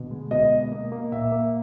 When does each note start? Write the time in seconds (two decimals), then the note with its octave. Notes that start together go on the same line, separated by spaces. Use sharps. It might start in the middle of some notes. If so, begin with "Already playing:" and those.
Already playing: B2 D3
0.11 G#3
0.31 B2 D#5
0.51 B3
0.72 A#3
0.92 A#3
1.12 A#2 E5
1.32 A#3